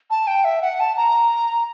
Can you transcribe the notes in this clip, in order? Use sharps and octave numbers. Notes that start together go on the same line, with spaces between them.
A5
G5
E5
F#5
A5
A#5